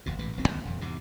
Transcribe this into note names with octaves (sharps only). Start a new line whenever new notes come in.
F#1 D#2 B2
A1 G#2 B2 E3
D#1 B1 B2 C4
D2 D#3 E3 B3
D#1 F2
E2 G#2 C3